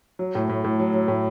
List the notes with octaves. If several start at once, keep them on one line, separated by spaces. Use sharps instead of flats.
F#3
A2
A2
A2
F#3
F#3
A2